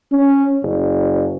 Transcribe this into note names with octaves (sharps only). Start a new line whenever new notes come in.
C#4
F#1